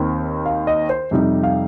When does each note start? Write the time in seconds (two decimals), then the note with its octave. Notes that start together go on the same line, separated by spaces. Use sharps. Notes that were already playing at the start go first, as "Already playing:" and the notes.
Already playing: D#2 D#3 C4 D#4
0.46 F5
0.67 D#5
0.89 C5
1.11 F2 C3 G3 D#4
1.43 F5